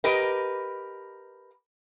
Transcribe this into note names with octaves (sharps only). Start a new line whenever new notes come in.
G4 A#4 B4 D#5